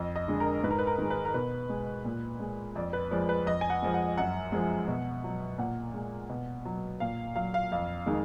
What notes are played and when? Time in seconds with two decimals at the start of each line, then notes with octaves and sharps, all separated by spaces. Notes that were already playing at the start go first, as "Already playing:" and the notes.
Already playing: F2 D#5
0.16 D#5
0.28 D3 G#3
0.40 A#4
0.64 G#2 B4
0.71 A#4
0.79 B4
0.87 A#4
0.98 D#3 G#3
1.10 B4
1.25 A#4
1.34 B2 B4
1.69 G#3
2.05 A#2
2.40 G#3
2.75 F2 D5
2.93 B4
3.11 F3 G#3 D5
3.29 B4
3.46 F2 D#5
3.61 G#5
3.70 F#5
3.82 F3 G#3
3.94 F#5
4.17 F#2 F#5
4.52 F3 G#3
4.87 B2
5.24 F#3
5.58 A#2 F#5
5.94 G#3
6.30 B2
6.65 F#3
7.00 A#2 F5
7.36 F#3 F5
7.54 F5
7.72 F2 F5
8.06 D#3 G#3